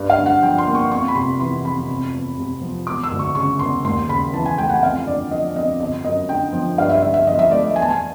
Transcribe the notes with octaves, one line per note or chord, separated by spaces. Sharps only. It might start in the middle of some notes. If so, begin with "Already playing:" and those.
Already playing: G2
F5
D3
F#5
F3 G5
C6
A#3
C#6
F2 C#6
B5
C3 C6
E3 C6
F2 B5
F1
E2
C3
F3
E1 D6
E6
D2
C#6
C#3 C#6
E1 C6
D#2 C6
C#3 B5
E3 A5
G#5
A3 G5
F#5
F2 F5
D3 D5
F3 D#5
F2 D#5
G1 D#5
F#2 D#5
D3 G5
F3
G2 F5
E5
D3 E5
E5
F3 D#5
E5
A3 D5
D#5
E2 G#5
A5
G#5